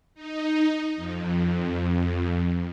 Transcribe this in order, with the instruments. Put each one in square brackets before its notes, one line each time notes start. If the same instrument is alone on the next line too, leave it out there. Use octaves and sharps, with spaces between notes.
[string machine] D#4
F2